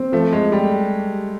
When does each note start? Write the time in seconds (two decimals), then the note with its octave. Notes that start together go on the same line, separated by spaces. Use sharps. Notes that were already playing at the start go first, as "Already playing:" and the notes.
Already playing: C4
0.12 F3 A3
0.32 G#3 A3
0.52 G3 G4